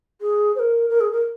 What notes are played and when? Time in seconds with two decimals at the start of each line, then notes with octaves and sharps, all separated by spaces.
0.21 G#4
0.56 C5
0.59 A#4
0.89 A#4
1.01 G#4
1.12 A#4